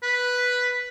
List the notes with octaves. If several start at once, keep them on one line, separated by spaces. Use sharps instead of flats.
B4